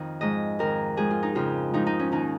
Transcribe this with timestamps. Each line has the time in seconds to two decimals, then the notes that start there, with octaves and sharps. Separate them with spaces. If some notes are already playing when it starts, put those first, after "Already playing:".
Already playing: F2 D#3
0.21 G#2 F3 D#5
0.59 F2 D#3 A#4
0.97 G#2 F3 G#4
1.11 F4
1.23 D#4
1.35 F2 C#3 F3 F4
1.74 G#2 F3 D#4
1.87 D#4
1.99 C#4
2.12 D#2 D#3 D#4